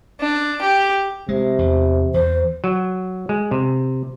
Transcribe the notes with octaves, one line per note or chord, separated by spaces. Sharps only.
D4
G4
C3 G#3
E2
E2 E3 C5
F#3
G#3
C3